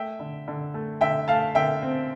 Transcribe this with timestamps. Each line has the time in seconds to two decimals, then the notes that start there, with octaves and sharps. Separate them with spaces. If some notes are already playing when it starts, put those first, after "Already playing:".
Already playing: A3 E5 G5
0.19 D3
0.48 D3
0.74 A3
1.01 D3 E5 G5
1.28 A3 F5 A5
1.55 D3 E5 G5
1.82 C4